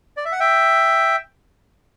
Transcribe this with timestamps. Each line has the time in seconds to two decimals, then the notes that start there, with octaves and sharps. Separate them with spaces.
0.17 D5
0.25 E5
0.32 F#5
0.40 E5 G5